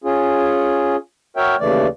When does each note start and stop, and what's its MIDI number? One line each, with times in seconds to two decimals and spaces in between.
0.04 0.96 61
0.04 0.96 65
0.04 0.96 68
1.37 1.56 66
1.37 1.56 70
1.37 1.56 73
1.37 1.56 76
1.37 1.56 79
1.60 1.87 39
1.60 1.87 49
1.60 1.87 52
1.60 1.87 57
1.60 1.87 74